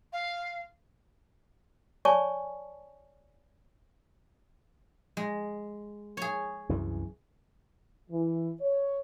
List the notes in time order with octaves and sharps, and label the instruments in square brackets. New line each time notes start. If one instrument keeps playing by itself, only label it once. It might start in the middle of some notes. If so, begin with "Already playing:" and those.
[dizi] F5
[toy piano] C#5 D5 G#5 A5 C#6
[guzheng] G#3
G#4 C#5
[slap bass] C2 F#2 E3
[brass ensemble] E3
C#5